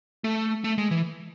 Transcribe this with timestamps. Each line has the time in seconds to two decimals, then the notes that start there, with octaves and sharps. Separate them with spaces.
0.24 A3
0.64 A3
0.78 G#3
0.91 E3